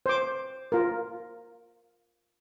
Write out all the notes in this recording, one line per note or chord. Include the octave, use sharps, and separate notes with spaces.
C5 D6
F4 A#4